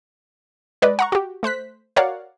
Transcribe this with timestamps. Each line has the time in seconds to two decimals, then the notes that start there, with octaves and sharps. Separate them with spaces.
0.82 G#3 B4 D5 D#5
0.99 F#5 A#5 C#6
1.12 F#4 G4
1.43 A3 C5 F#6 B6
1.96 F#4 A#4 C#5 D5 F5 F#5